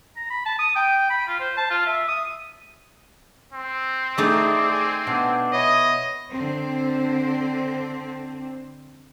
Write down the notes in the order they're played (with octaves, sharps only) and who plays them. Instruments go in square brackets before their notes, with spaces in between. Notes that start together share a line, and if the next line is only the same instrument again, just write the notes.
[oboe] A#5
B5
A5
D#6
G5
B5
F4
C5
A5
F4
E5
D#6
[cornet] C4
[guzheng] A3 D#4 A4 [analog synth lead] G#4 [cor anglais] D5
[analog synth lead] G#5
[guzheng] B2 [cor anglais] D4
[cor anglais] E4 [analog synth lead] C#5 [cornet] D#5
[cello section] D3 C4